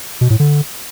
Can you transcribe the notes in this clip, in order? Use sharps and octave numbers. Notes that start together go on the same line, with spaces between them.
B2
A2
D3